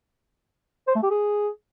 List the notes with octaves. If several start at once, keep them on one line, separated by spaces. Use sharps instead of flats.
C5
A3
G4
G#4